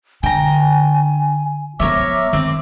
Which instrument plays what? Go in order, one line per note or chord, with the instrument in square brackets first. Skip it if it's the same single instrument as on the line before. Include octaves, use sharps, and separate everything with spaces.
[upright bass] D3 [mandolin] G5 A#5 [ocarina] G#5
[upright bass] F3 B3 [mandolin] A#4 C#5 E5 [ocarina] D6
[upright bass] D#3 [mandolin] C4